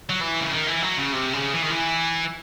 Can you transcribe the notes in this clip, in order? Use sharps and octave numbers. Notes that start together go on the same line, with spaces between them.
F#3
E3
C#3
D#3
E3
F#3
C#3
C3
C#3
E3
D#3
E3